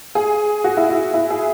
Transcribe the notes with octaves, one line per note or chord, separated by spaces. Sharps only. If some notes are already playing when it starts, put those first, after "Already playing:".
G#4
F#4
E4
E4
E4
G#4